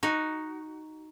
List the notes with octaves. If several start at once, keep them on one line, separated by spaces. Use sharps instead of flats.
D#4 F#4